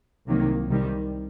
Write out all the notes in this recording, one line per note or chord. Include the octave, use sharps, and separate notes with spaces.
C2 C3 D#3 F#3 A#3
C2 C3 D#3 G3